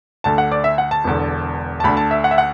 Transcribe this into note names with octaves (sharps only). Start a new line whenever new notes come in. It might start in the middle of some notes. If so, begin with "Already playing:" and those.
D2 D3 A5
F#5
D5
E5
F#5
A5
E1 E2 D3
A5
D2 D3 B5
A5
E5
F#5
E5
F#5